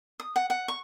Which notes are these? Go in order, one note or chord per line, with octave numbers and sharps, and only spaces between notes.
D#6
F#5
F#5
C#6